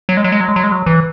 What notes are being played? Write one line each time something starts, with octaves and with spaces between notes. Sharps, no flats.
F#3
G#3
F#3
G#3
F#3
G#3
F#3
G#3
F#3
E3